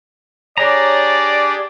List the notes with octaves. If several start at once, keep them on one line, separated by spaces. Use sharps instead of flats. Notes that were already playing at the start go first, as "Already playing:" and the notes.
D4 G4 G#4 C#5 D5 A#5